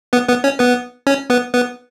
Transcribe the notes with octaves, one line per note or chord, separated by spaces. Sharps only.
B3 B4
B3 B4
C#4 C#5
B3 B4
C#4 C#5
B3 B4
B3 B4